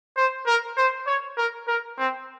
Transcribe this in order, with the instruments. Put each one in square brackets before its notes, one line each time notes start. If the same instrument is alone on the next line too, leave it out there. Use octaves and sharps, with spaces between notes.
[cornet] C5
A#4
C5
C#5
A#4
A#4
C4